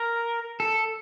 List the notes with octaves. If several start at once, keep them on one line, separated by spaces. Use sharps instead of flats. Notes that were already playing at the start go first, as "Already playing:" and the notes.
Already playing: A#4
A4